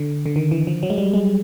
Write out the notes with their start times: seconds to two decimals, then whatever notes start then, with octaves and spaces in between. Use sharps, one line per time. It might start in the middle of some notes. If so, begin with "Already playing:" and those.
Already playing: D3
0.26 D3
0.36 D#3
0.51 E3
0.67 F3
0.83 F#3
0.90 G#3
0.98 G3
1.13 G#3